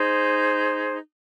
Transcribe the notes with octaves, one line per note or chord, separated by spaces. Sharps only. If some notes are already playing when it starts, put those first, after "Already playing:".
Already playing: D#4 G#4 C5